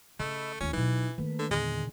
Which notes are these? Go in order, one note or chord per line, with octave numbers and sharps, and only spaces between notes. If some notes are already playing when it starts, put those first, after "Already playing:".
C#3 A3 D#5 B5 E6
D#2 C#4 F4
B2 E3 F#3 D#4
D#3 A3 A#3 B4
D3
E2 A#2 D3 D#3 G#3